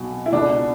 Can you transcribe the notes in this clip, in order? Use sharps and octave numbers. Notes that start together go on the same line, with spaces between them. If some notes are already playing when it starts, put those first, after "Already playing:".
Already playing: B1 B2
E4
C#2 B2 D4